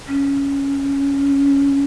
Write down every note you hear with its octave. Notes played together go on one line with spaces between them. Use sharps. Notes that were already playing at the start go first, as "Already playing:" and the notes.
C#4